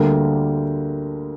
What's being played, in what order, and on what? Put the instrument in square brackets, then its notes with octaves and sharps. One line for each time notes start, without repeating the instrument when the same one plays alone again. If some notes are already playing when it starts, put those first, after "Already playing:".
Already playing: [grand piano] D2 D3 G3 A#3 A#4